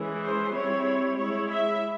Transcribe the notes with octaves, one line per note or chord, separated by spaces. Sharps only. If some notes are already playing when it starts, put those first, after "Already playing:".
Already playing: E3 G#3 C#4
C5
G3 C4 E4 C#5
G#3 E4 C#5
E5